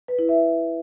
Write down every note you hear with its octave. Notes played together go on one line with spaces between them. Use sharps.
B4
E4
E5